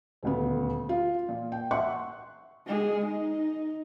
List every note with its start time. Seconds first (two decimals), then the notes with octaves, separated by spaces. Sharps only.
0.23 D#1 D2 B3
0.89 F4
1.29 A#2
1.52 G5
1.71 E5 F#5 C6 C#6 F#6
2.67 G#3 G#4
3.06 D#4